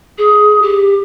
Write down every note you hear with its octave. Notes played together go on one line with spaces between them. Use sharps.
G#4
G4